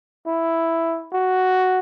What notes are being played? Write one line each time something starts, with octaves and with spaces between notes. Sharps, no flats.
E4
F#4